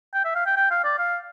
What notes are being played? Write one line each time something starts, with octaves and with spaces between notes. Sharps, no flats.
G5
E5
F5
G5
G5
F5
D5
F5